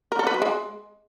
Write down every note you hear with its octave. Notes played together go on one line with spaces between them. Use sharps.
A#4
A4
B4
F#3
G#3